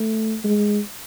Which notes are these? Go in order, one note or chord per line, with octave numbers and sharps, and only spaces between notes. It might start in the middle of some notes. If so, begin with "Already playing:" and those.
Already playing: A3
G#3